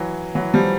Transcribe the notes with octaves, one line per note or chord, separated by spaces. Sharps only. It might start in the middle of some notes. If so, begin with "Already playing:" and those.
Already playing: E3 F#3
E3 F#3
F3 G3